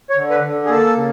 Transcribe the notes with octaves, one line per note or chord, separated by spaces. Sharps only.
C#5
D3
B4
D3
G#4
A#3 A4
C#3